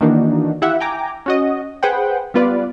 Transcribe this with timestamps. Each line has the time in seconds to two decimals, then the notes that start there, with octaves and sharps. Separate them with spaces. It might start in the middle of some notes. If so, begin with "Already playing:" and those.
0.01 D#3 E3 A#3 D4 D#4 F#4
0.62 E4 F4 G4 E5 F#5
0.80 G5 G#5 A#5 D6
1.26 C#4 F#4 D#5
1.83 G#4 B4 C5 F#5 G5
2.34 G3 B3 F4 B4 D5